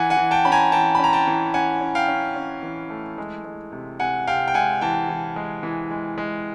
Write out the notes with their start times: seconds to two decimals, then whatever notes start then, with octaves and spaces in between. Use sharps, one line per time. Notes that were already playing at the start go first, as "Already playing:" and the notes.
Already playing: E3 F#5 G#5
0.10 F#5 G#5
0.17 E3
0.31 G5 A5
0.45 C#4 B5
0.52 G#5 A#5
0.72 E3 G5 A5
0.95 B5
0.99 C#4 A#5
1.13 G5 A5
1.27 E3
1.54 C#4 F#5 G#5
1.81 C#4
1.95 F5 G5
2.08 C#4
2.36 C#4
2.63 E3
2.90 A3
3.18 G#3
3.45 G#3
3.72 C3
4.00 C3 F#5 G#5
4.27 C3 F5 G5
4.48 G5
4.54 G#3 F#5 G#5
4.81 E3 G5 A5
5.09 E3
5.36 G#3
5.63 E3
5.91 G#3
6.18 G#3